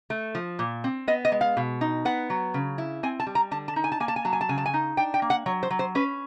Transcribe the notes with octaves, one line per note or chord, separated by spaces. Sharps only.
A3
F3
A#2
C4
B3 D#5
D#5
G#3
F5
B2
D#4
B3 F#5
F#3
C#3
E4
C4 G#5
A5
G3
A#5
D3 A5
A5
D#4
G#5
A5
A#3 G#5
A5
G#5
F#3 A5
G#5
A5
C#3 G#5
A5
G#5
D#4
D4 G5
G5
A#3
F#5
F#3 C#5
C5
F#3
C5
C#4 B4